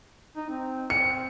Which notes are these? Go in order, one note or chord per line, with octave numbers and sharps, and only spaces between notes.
D#4
C4
C4 C#7